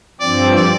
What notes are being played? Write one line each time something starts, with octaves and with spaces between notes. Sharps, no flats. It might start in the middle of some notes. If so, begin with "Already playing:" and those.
G2 F3 C4 D5
D5